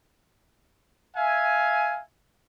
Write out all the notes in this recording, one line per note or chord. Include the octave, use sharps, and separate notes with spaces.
E5 F5 G#5